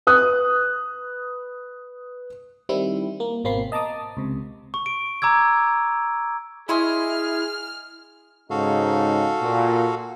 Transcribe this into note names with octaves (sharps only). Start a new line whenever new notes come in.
B4 D#6 F#6
D#3 G3 C4 E4
A#3
G#1 B2 A#3 C4 B5 C7
D#5 A5 A#5 D6 D#6
C#2 C3
C#6
D7
A#5 D6 E6 G#6
E4 G#4 C#5 D#5 C6 F6
G#2 C#3 D#4 F#4 A4 F5
A#2